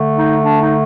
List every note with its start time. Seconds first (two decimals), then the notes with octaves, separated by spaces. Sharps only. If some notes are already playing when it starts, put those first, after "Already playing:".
Already playing: D3 A3
0.17 D#4
0.44 D4
0.61 D#4